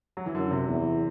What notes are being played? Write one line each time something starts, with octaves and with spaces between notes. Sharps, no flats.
F#3
E3
F#2 D3
C3
E2